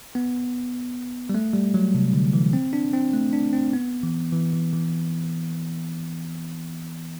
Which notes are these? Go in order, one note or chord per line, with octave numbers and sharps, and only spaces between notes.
B3
G3
A3
G3
F#3
C3
D3
E3
C4
D4
C4
A3
D4
C4
B3
E3
E3
E3
E3